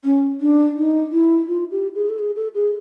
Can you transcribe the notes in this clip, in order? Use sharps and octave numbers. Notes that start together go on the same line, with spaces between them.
C#4
D4
D#4
E4
F4
G4
G#4
A4
G#4
A4
G#4